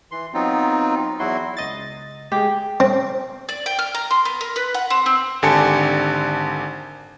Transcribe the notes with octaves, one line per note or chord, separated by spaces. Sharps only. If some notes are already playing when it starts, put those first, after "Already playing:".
E3 C6
F#3 B3 C4 D#4 F4
E2 F#3 E4 F#4 C6
C#2 D#5 A6
G#3 G4 G#4
C4
D5
G5
F6
A#5
C6
B3
A#4
B4
F#5
C4
C4
G#1 D3 G4 G#5 A5 C#7